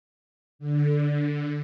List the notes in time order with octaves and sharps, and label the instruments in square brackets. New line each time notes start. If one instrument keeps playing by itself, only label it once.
[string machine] D3